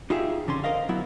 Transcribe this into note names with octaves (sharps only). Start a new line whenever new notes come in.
D#4 F4 G4 G#4 E5
F2 D3 C#4 C6
A#4 C5 D#5 F5
F#3 B3 E4